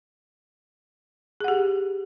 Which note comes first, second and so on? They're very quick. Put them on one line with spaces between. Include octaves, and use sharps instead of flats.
G#4 F#5 G4